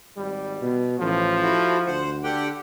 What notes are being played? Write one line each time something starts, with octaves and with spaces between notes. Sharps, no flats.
G#1 G3
B2
A1 F3
A3 E4 F#4
D2 C5 F#5
D3 G4 F#5 G5